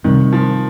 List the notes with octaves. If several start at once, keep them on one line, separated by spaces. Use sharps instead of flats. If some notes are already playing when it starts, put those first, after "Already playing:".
C3 D#3 G3 C4
F3